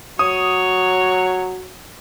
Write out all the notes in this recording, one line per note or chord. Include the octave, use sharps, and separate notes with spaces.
F#3 C#5 D#6